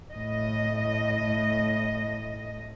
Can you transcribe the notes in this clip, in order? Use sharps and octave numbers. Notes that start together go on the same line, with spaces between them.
A2 D#5